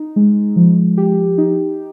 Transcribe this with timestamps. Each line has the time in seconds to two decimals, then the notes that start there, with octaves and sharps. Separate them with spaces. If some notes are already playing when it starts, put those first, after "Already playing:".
Already playing: D#4
0.16 G#3
0.56 F3
0.97 G4
1.38 D#4